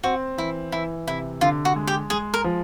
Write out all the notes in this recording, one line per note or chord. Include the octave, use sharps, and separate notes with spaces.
C4 F#4
E3 E4
E3 E4
C3 E4
D3 F4
F#4
G#3
G4
G#3 G#4
A#4
F3